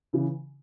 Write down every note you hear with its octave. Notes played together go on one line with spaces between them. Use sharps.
C#3 E3